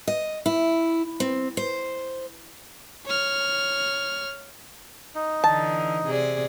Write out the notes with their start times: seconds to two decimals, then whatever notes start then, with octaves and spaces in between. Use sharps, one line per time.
0.07 D#5
0.46 E4
1.20 C4
1.57 C5
3.06 C#5 F6
5.15 D#4
5.44 D3 E3 A5
6.06 C3 G#4 D5